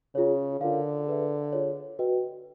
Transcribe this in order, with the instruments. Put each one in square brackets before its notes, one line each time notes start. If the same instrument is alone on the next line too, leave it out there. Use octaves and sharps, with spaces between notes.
[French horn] C#3 [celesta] F4 G#4 C#5
[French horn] D3 [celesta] F4 A#4 C#5 F5
[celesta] G#4 B4 E5
F4 G#4 C#5
F#4 B4 D#5 G5